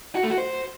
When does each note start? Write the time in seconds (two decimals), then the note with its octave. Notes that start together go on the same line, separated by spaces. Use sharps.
0.15 F#4
0.23 A3
0.30 F#4
0.38 C5